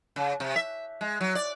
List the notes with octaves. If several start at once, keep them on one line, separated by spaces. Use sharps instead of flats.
C#3
C3
E5
G#3
F#3
D5